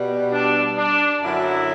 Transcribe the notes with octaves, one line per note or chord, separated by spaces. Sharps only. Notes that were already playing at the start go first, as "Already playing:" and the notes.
Already playing: B2 G3
D4
D4
F#2 D3 F#3 E4